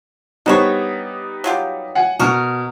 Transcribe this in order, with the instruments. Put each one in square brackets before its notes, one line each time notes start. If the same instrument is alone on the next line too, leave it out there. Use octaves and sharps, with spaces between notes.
[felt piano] G3 B3 D#4 [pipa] D4 C5 C#5
[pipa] F#3 F4 G4
[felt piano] F#5 G#5
[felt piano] B2 F6 [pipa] F#4 A#4